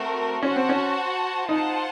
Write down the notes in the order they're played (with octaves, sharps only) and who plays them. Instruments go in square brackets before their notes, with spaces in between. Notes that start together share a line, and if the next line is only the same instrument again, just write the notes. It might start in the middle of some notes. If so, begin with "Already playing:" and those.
Already playing: [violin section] A3 C4 F#4 A#4
[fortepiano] C#4 [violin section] F#4 C5 F#5 A5
[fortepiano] C4
C#4
[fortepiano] D#4 [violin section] F4 C5 F#5 A5